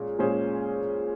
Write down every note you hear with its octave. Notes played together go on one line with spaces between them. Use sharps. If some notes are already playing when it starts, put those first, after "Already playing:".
Already playing: A#2 G#3 C#4
A#2 G#3 C#4 G#4 C5